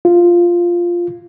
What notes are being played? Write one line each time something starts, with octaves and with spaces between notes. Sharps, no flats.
F4